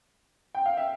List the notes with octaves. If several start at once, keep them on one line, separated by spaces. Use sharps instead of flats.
G5
F5
E5